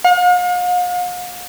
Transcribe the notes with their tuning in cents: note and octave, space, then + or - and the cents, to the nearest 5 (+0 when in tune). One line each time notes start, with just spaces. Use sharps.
F5 +45